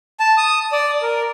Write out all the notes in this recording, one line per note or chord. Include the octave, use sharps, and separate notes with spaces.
A5
D#6
D5
A#4